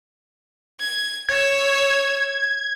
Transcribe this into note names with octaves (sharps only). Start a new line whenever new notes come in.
G#6
C#5 E6 G#6